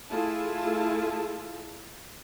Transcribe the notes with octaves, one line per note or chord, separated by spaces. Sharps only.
A3 E4 F4 G#4 A4 A5